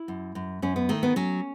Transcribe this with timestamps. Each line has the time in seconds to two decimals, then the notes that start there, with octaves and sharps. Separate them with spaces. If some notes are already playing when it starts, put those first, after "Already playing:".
Already playing: E4
0.08 F#2
0.35 F#2
0.62 F#2 C#4
0.76 B3
0.89 D#3 A3
1.03 B3
1.16 F#3 C#4